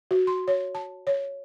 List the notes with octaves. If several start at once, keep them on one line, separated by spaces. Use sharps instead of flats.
F#4
C6
C#5
A5
C#5